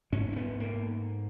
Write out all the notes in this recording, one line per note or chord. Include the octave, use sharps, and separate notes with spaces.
G#2 C#4
C#4
B3
A#3